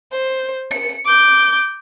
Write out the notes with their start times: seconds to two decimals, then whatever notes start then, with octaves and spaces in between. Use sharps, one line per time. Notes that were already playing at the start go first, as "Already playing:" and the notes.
0.12 C5
0.71 C#7
1.05 D6 G6